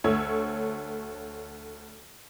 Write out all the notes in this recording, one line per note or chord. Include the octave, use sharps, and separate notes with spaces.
D2 A3 C#5 E6 G#6